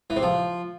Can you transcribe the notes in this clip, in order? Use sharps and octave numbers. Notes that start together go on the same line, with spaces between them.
E3
C3
F3